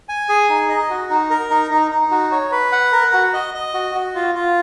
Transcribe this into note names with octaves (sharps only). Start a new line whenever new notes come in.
G#5
G#4
D#4
D#5
F#4
D#4
A#4
D#4
D#4
D#4
F#4
C#5
B4
F#5
A#4
F#4
D#5
D#5
F#4
F#4
F4
F4